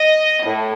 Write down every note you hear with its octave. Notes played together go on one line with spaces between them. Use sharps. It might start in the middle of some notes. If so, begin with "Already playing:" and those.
Already playing: D#5
A2